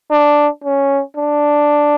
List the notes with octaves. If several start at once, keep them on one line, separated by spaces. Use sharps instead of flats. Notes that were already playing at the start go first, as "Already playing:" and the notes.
D4
C#4
D4